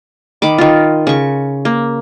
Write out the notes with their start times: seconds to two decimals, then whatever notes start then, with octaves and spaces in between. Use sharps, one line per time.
0.42 D#3 B5 D6
0.58 D#3 F4
1.07 C#3 C#6
1.65 A#3